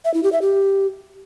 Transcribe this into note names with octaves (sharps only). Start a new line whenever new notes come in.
E5
E4
G4
E5
G4